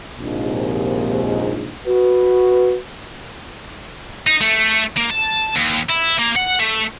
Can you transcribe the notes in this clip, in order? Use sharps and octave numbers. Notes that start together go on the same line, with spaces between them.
A#1 D#2 G#2 C3
F#4 B4
D#4
A3
A#3
A5
D#2
E4
A#3
F#5
A3